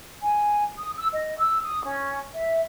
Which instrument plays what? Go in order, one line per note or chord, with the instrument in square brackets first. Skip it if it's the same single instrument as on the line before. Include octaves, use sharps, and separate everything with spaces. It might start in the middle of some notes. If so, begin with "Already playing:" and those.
[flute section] G#5
D#6
E6
D#5
E6
D#6
C#4
E5